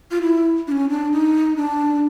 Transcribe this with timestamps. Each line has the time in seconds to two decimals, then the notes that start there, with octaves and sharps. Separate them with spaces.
0.11 F4
0.22 E4
0.67 D4
0.72 C#4
0.89 D4
1.12 D#4
1.56 D4